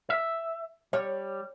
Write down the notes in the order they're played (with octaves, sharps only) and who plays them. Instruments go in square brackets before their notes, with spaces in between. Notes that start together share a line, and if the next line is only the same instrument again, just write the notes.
[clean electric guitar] E5
[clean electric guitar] G3 [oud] C#5